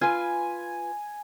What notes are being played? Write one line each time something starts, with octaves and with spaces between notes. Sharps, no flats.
F4 B4 G#5